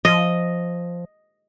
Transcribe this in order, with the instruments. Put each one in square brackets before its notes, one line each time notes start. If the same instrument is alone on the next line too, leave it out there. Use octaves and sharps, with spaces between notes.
[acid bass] F3 [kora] D#5